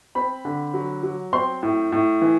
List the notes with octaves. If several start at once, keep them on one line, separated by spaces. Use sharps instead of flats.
C4 B5
D3
F#3
F#3
C4 C6
A2
A2
E3